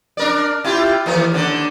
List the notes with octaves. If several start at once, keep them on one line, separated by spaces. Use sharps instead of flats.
D4 A#4 D5
E4 F4 G4
D#2 E3 A#4
D#2 D3 D4